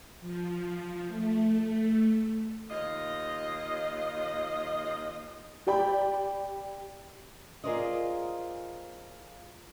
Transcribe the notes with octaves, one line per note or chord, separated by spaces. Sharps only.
F3
A3
D#2 F4 D#5
G4 D5 G5 B5
F4 G#4 A#4 C5 D5 D#5